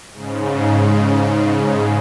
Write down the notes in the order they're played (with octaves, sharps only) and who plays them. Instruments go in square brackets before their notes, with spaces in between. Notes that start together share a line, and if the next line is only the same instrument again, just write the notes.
[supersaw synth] G#2 C#3